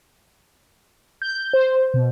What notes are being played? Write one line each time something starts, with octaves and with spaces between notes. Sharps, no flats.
G6
C5
B2